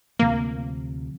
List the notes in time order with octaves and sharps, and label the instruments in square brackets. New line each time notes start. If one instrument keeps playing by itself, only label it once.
[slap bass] D2 C3 F3 A3 [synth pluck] A#3